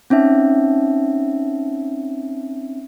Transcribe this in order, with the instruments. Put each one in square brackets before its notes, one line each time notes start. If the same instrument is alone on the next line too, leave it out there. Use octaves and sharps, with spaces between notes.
[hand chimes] C4 C#4 D#4 E5